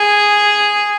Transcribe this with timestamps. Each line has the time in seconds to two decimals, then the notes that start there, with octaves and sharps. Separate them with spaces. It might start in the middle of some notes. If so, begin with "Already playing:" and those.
Already playing: G#4